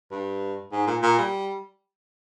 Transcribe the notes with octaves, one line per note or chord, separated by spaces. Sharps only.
G2
G#2
A#2
A#2
G3